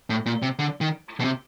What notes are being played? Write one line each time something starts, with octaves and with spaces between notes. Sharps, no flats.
A2
A#2
C3
D3
D#3
B2
C3